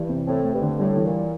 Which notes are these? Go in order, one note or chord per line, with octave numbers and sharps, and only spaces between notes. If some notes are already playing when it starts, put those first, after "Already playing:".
Already playing: G2 E3
C3
A2 C4
A3
G2
D3
A2 G3
E3
A#2